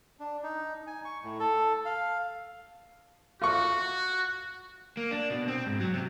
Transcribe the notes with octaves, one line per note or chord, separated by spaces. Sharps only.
D4
D#4
G#5
C#6
A2
A4
F5
F4 F#4 C#6
A#3
D4
B2
C4
G#2
F#3
C3